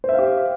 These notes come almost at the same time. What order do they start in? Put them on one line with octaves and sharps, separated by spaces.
C5 E5 F5 G4